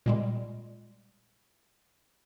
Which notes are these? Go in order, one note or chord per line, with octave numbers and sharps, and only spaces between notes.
A#2 G3 G#3